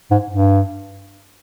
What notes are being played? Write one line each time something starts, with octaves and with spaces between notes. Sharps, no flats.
G#2
G2